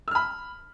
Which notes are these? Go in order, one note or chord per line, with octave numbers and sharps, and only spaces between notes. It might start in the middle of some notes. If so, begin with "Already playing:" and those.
B5 E6 F6